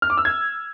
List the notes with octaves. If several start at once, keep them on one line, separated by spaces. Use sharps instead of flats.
F6
D6
E6
G#6